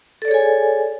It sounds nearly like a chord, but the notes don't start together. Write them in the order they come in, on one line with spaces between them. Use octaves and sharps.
A4 D5 C#5 G#4 G#5